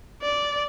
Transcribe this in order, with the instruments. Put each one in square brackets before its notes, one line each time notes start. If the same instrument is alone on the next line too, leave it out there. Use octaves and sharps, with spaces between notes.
[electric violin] D5